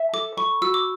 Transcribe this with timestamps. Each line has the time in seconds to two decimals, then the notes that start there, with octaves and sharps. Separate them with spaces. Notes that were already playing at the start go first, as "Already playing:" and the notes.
Already playing: E5
0.13 A4 D6
0.37 B5 C#6
0.62 F#4 E6
0.74 D6